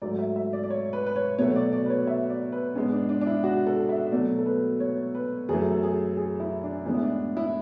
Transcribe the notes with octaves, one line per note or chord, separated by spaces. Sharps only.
G#2 F#3 A3 D5
E5
E5
D5
D5
C#5
B4
B4
C#5
B2 F#3 A3 C#5
C#5
D5
D5
B4
C#5
E5
D5
B4
G#2 G#3 B3 C#4
D4
D4
D4
E4
F#4
A4
E5
B2 F#3 A3 D5
A4
B4
C#5
B4
F#2 E3 A3 G#4
A4
G#4
G#4
E4
D4
A2 E3 G#3 B3 C#4
E4
D4
E4